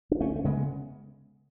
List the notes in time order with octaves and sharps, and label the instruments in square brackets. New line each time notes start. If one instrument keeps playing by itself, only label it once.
[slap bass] D4
D2 A3 C#4
A3
C#3 G#3 B3